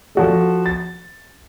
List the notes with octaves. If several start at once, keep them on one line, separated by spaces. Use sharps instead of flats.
F3 F#4 A4
A6